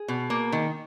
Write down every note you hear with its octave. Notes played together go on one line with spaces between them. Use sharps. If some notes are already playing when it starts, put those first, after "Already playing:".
Already playing: G#4
B2
A#3
D#3